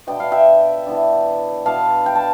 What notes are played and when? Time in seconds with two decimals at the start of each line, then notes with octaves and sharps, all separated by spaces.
0.07 B2 B3 D4 G5
0.20 F5
0.32 E5 G5
0.87 E3 B3 D4
1.66 B2 B3 D4 F5 A5
2.06 G5
2.15 A5